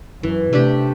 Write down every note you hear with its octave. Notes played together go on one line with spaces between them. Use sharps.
F#2 E3
C3 A3 D4 G4